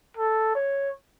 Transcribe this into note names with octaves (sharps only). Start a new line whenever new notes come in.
A4
C#5